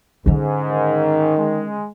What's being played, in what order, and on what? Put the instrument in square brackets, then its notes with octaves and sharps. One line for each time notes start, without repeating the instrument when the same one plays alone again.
[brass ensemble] G#2 [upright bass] D3 C#4
[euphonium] D#3
[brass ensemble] G#3